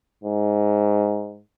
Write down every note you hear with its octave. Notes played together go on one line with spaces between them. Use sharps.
G#2